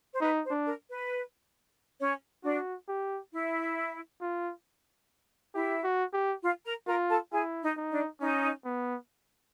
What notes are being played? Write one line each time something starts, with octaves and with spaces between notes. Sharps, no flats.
C5
D#4 B4
C5
D4
A#4
B4
C#4 C#5
D4 F#4 D5
G4
E4 E5
F4
E4 G4 E5
F#4
G4
F4 F5
A#4 A#5
F4 A#4 A#5
A4 A5
E4 G#4 G#5
D#4 D#5
D#4
D4 D5
C#4 D#4 D#5
B3